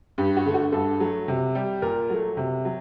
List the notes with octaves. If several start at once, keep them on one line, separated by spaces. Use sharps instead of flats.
G2 G4
F#4
D3 A3
F#4
G2 A4
F#3 A3
C3
G3
A#2 A#4
F#3 A3
C3
F#3